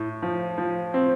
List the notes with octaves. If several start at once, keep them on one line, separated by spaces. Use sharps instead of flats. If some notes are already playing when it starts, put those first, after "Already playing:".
Already playing: A2
F3
F3
C4